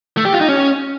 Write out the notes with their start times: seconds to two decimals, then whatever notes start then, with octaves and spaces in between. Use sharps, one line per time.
0.17 A3
0.25 G4
0.33 F4
0.41 D#4
0.49 C#4